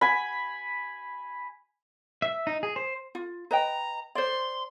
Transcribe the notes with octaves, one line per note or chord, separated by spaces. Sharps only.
G#5 B5
E5
D#4
G#4
C5
F4
B4 D#5 G5 A#5
C5 D5 C6